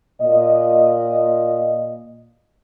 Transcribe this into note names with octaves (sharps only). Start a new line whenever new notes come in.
A#2 D#5